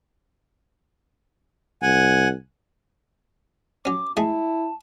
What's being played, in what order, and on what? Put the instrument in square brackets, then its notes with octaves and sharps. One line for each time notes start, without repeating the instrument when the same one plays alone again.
[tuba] C2 [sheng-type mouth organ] F#5 G#5
[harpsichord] F#3 C#4 [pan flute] D6
[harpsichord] G#3 A3 G#4 [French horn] E4 [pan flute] A5